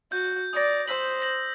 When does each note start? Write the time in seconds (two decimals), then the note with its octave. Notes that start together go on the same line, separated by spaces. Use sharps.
0.12 F#4 G6
0.53 D5 D#6 A#6
0.88 C5 E6 B6 F#7
1.22 A#6 F#7